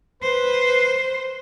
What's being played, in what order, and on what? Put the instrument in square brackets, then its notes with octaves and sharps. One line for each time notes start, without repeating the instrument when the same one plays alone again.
[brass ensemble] B4 [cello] C5